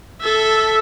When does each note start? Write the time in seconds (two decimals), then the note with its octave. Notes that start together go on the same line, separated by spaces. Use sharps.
0.22 A4 E5